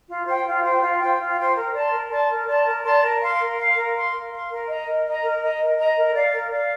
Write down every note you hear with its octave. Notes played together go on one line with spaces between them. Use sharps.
F4
C5 G5
F4
C5 G5
F4
C5 G5
F4
C5 G5
A#4
D5 A5 C6
A#4
D5 A5 C6
A#4
D5 A5 C6
A#4
D5 A5 C6
A#4
F5 C6
A#4
F5 C6
A#4
F5 C6
A#4
F5 C6
A#4
D#5 A#5
A#4
D#5 A#5
A#4
D#5 A#5
A#4
D#5 A#5
A#4
D5 F5
A#4
D5 F5